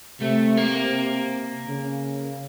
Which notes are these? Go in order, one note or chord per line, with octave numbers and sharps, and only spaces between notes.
C3 A3
A#3
C#3